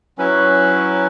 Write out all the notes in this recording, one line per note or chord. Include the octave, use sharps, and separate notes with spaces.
F#3 C#4 E4 B4